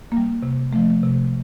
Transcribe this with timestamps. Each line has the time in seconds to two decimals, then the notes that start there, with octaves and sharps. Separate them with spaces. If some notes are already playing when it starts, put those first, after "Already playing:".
0.12 A#3
0.17 G3
0.43 C3
0.73 F3 A3
1.03 C3